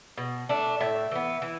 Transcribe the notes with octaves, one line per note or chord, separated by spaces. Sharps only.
B2
A3 D4
A2 E5
E3 B3
E3